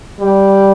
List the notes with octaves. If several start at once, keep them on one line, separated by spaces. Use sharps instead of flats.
G3